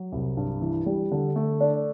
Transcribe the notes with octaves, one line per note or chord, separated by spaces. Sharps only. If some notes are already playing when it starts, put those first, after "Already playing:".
Already playing: F#3
C2
G2
E3
G3
D3
A3
D4